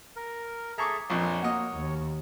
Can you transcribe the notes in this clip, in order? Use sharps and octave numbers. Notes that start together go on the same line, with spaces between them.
A#4
G#4 A4 E5 A#5 C#6 D6
A#1 F2 A#2 C#5
A#3 F#4 D#5
D#2